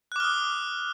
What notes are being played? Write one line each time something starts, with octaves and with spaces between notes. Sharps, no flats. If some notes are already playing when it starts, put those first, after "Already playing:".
D6 D#6 F6 F#6